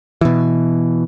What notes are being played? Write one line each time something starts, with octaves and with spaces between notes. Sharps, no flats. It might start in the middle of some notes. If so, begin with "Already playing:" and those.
B2 E3